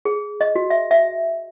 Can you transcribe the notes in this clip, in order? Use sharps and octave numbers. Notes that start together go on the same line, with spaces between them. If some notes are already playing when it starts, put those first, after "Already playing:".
G#4
D#5
F#4
E5
E5